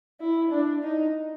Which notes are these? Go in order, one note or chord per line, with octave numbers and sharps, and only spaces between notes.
E4
D4
D#4